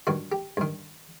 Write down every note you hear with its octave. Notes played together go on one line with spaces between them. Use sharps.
G2 D#3 F#4
G4
G2 D#3